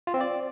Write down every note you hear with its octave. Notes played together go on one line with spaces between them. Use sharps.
F4
C4
D5